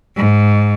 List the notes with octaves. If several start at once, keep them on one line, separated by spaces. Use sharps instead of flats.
G#2